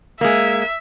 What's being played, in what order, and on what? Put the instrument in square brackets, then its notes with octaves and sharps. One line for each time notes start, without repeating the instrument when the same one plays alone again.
[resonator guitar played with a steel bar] G#3 A#3 [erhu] E5